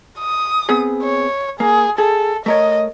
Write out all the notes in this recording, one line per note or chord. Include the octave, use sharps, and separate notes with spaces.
D#6
B3 C4 G#4
C#5
A#3 G#4
G#4 A4
A3 A#4 C#5 D#5